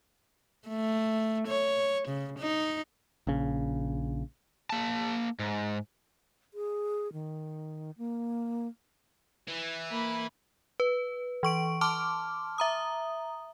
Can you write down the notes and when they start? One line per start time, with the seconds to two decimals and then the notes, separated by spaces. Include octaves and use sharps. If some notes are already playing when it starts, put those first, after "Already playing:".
0.68 A3
1.47 C#5
2.08 C#3
2.39 D#4
3.27 A#1 C#3
4.70 A#3 A5
5.39 G#2
6.54 G#4
7.13 D#3
7.98 A#3
9.48 E3
9.90 A#3 B5
10.80 B4
11.43 E3 C#6 D7
11.81 A5 C6 D6 F6
12.58 E5 A#5 D#6